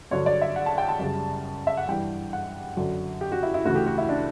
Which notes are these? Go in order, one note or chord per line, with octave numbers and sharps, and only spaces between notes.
G2 D3 F#3 C#5
D5
E5
F#5
A5
G5
A5
F#2 C#3 G3
E5
F#5
G2 E3 G3 G5
F#5
F#2 D3 F#3
G4
F#4
E4
E4
D2 C#3 E3 A3 F#4
G4
F#4
E4
D4